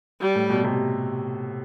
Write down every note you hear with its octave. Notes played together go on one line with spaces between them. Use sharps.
G3
A2
B2
C3